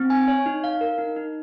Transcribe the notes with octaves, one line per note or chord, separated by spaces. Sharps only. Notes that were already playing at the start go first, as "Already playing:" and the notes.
Already playing: C4
G#5
C#5
D#4
F5
A#4
D#4
D#4